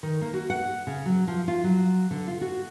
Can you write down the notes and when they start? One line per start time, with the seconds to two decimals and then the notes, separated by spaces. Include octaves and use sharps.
0.03 D#3
0.21 A#3
0.34 F#4
0.50 F#5
0.87 C#3
1.06 F#3
1.27 F3
1.48 F4
1.64 F#3
2.11 D3
2.28 F4
2.41 F#4